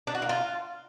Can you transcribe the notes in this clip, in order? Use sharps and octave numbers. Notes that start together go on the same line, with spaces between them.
D4
F#4
A#3
F4